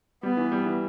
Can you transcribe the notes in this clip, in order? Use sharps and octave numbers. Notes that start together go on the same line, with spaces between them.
G3 B3
E3
G3
E3